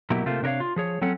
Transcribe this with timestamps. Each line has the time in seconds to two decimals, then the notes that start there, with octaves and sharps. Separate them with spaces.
0.10 B2 F#3 A#3 E4 G4
0.26 C3 A3 A#3 F4 C5
0.42 C3 D4 A#4 C#5 F5
0.60 F4
0.76 F3 G#4 C#5
1.01 F#3 C4 C#4 A4 F#5